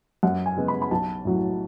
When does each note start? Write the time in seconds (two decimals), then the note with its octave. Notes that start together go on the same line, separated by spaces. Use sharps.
0.23 F#2 F#5
0.46 G#5
0.57 C#3 G#3 B3
0.68 B5
0.82 B5
0.91 B1 A5
1.25 A2 F#3